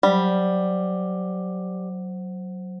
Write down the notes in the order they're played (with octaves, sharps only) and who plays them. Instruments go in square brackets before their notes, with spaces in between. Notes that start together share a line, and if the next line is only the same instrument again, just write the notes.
[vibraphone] F#3 C5 [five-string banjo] G3